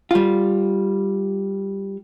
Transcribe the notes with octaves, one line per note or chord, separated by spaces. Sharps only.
G3 F4